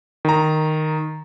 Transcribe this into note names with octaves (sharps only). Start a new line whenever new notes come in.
D#3 A#5